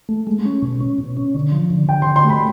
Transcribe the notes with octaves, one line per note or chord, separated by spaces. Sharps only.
A3
G#3
C#4
B2
C#4
B2
C#4
D3
F3
D3
D3 G5
D3 C6
C6
A3 B5